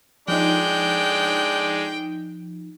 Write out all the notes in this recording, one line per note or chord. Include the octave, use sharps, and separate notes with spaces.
F3 G#3 D4 D#4 G5